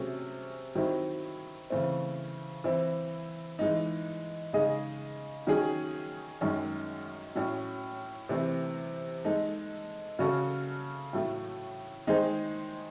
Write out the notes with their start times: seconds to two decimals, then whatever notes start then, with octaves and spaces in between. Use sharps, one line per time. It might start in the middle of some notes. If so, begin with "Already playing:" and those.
Already playing: C3 F#3 A3 C#4 G#4
0.75 D#3 F#3 C4 E4
1.70 C#3 E3 A3 C4
2.64 E3 C4 E4
3.59 E3 G#3 D#4
4.53 C#3 G#3 D#4 G#4 D#5
5.47 D#3 F#3 C#4 G#4
6.41 F#2 D#3 G#3 C#4
7.35 A2 F#3 C#4
8.29 C3 E3 A3 C4
9.25 G#3 D#4 A4
10.19 C#3 F#3 C#4 F#4 A4
11.13 A2 F#3 A3
12.07 D#3 G#3 D#4 G#4 C5